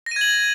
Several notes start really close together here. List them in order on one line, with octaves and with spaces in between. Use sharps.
A#6 D#7 G#6 F#7